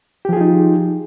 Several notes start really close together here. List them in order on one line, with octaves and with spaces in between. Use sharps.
G4 F3 G#4 F4 D#4